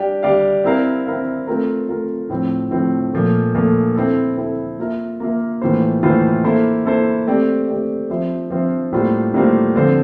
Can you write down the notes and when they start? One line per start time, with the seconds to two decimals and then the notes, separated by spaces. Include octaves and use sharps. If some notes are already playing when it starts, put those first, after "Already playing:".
Already playing: G3 D4 G4 D5 F5
0.23 G3 D4 G4 D5 F5
0.64 C4 E4 A#4 F5
1.07 C4 E4 A#4 F5
1.47 A3 C4 F4 A#4
1.89 A3 C4 F4 A#4
2.30 A2 F3 C4
2.71 A2 F3 C4
3.13 A#2 F3 A3
3.55 A#2 F3 A3
3.95 C4 E4 A4
4.37 C4 E4 A4
4.79 A#3 F4 A#4 E5
5.20 A#3 F4 A#4 E5
5.61 A2 E3 A#3 F4 C5
6.03 A2 E3 A#3 F4 C5
6.44 A#3 E4 A4 C5
6.86 A#3 E4 A4 C5
7.27 A3 C4 G4 D5
7.68 A3 C4 G4 D5
8.10 F3 C4 F4 C5 E5
8.50 F3 C4 F4 C5 E5
8.92 A2 G3 A#3 F4 C5
9.34 A2 G3 A#3 F4 C5
9.75 D3 F3 C4 F4 C5